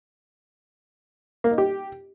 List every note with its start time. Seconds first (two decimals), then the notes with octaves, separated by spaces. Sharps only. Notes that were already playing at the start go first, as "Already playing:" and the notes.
1.44 A#3
1.51 D#4
1.58 G4